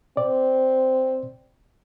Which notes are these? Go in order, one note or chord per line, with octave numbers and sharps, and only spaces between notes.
C4 D5